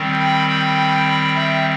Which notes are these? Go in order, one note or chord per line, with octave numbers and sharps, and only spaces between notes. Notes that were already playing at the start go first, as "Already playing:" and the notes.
Already playing: D#3 G3 C4
G5 B5
G5 B5
E5 G5